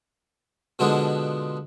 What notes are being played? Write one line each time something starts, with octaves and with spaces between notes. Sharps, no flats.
B2 D3 F3 G#3 B3 D4